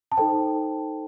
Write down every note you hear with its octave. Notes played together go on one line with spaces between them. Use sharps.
A5
D#4 A4 C5 G5